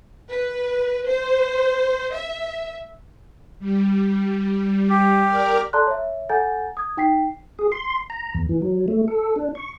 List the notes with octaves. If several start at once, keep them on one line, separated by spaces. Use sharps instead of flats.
B4
C5
E5
G3
G4
A#4 D5 F6
A4 D5 A5 A#5 C6 F#6
C#5 E5
A4 F#5 G#5 A#5 G6 A6
D#6 G#6
D#4 G5 B6 C7
G#4
C6
A#5
E2
E3
F#3
A3
A4
D4
C#6